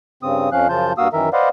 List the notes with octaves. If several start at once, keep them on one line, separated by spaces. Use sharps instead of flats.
G2 C#3 C4 D#6
F2 F3 C#4 F5 F#6
F#2 C#3 F3 F4 A5 G6
G2 A#3 F#4 F5 D#6 E6
F#2 D#3 E3 A#4 E5
B4 C5 D5 D#5 F5 F#5